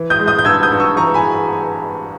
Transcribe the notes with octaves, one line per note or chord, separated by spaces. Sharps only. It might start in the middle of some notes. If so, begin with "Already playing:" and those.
Already playing: E3
D#6 G6
G#3
D#6 G6
G6
G2 E6 G#6
D#6 G6
G2
C#6 E6
E3 A#5 C#6
G#5 B5